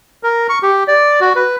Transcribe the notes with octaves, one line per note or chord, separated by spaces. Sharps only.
A#4
C#6
G4
D5
F#4
B4